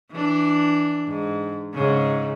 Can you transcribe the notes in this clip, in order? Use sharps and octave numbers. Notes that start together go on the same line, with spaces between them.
E3 D4
G#2
G#2 C#3